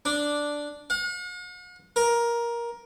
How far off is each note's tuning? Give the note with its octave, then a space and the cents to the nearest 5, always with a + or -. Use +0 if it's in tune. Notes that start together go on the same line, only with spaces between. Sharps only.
D4 -5
F#5 -45
A#4 +15